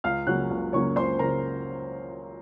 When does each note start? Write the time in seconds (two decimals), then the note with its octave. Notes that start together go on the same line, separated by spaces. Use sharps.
0.04 C#2 F5 F6
0.27 C#3 F#3 A#3 C#4 F#5 F#6
0.51 C#2
0.73 C#3 F#3 A#3 C#4 C#5 C#6
0.96 C#2 C5 C6
1.19 C#3 A#4 A#5